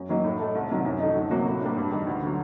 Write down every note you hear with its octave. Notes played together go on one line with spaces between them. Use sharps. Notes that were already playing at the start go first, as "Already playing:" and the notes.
Already playing: F#2
D#3 F#3 A#3 D#4
A2
A3 D#4 A4
C2
C3 D#3 F#3
F#2
D#3 A3 D#4
D2
C3 F#3 A#3 F#4
A2
G3 A#3 D4
G2
D#3 G3
D2
D3 F#3